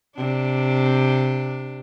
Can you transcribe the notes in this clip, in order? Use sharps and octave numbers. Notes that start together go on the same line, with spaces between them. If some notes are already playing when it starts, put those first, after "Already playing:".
C3 D4